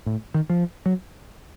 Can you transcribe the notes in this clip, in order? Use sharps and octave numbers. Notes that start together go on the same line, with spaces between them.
A2
D#3
F3
F#3